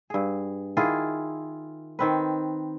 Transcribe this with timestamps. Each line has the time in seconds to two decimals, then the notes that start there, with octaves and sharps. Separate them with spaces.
0.10 G2 G#4
0.77 D#3 E4 F4 G#4
1.99 D#3 C4 B4